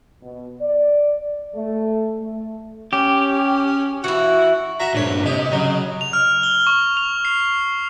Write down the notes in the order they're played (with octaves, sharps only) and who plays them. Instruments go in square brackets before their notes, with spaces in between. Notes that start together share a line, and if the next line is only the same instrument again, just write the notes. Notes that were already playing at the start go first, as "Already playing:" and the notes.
[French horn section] B2
D5
A3
A3
[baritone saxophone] C#4 [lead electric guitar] G4
[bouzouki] E3 E4 [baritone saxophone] F#4
[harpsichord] F#4 E5 A#5
[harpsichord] A#1 C#5 [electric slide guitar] G2 A#2
[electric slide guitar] C3 [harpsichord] G4 [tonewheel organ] D#5
[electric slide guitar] C#3 [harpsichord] F#3
[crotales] F7
F6
G7
C#6
F7
C7